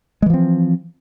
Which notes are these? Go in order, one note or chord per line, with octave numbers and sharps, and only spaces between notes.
E3 F3 G#3 C4